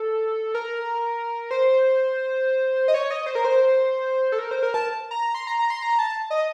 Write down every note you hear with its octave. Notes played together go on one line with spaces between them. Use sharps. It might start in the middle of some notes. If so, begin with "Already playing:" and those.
Already playing: A4
A#4
C5
D#5
C#5
D#5
C5
A#4
C5
A4
A#4
C5
A#4
A5
A#5
C6
A#5
A#5
C6
A#5
A5
D#5